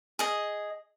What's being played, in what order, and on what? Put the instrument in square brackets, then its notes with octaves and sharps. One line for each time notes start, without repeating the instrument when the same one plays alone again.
[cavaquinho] G#4 D#5